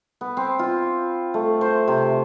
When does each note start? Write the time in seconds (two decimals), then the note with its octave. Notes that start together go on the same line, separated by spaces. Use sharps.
0.21 B3
0.37 C4
0.59 F4
1.34 A3
1.61 C5
1.88 C3